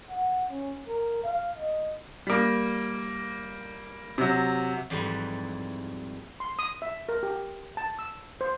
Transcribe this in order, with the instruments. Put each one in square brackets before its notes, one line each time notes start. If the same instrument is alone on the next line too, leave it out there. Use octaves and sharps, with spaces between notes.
[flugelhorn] F#5
C#4
A#4
F5
D#5
[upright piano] G3 A#3
C3 F#3
[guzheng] F2 G#2 E3 G3
[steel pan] C6
D#6
E5
A#4
G4
A5
E6
C5